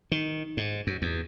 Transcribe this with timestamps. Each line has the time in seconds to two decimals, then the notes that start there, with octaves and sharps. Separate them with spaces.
0.12 D#3
0.57 G#2
0.87 F#2
1.02 E2